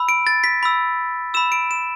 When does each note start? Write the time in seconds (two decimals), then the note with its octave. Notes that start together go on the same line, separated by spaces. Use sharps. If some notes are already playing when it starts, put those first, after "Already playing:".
Already playing: B5 E6
0.09 D7
0.27 A6
0.44 B6
0.63 B5 E6
1.34 B5 E6 E7
1.52 D7
1.71 E7